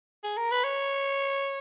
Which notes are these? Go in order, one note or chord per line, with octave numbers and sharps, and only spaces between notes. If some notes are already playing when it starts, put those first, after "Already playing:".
G#4
A#4
B4
C#5